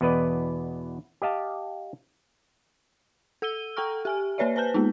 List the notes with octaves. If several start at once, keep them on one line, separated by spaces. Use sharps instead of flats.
E2 B2 B3 B4 D5 D#5
G4 D#5 F5 A5
A4 E6 D#7 G7
A4 G5 A#5 C#6 F6
G4 G#5 F6
A#3 G4 B4 C#5 D5 E5
B4 C5 G#5 A5 G6
G#3 A#3 B3 D#4